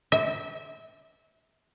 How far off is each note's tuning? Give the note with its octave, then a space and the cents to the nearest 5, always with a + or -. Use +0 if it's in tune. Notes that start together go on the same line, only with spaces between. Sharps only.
E5 -25